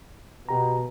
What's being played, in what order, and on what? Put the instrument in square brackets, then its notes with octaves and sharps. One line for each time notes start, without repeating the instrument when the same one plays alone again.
[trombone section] B2 [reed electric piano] G4 A#5